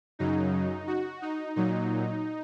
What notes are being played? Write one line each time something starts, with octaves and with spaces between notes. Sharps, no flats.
F#2 C#3 F#3 D#4
F#4
D#4
A#2 F#3 D#4